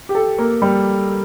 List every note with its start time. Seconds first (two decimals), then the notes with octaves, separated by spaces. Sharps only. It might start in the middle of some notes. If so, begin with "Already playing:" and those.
0.09 G4
0.15 A4
0.38 A#3
0.62 G3